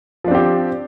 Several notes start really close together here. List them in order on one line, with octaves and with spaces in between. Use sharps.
F3 D4 C4 G4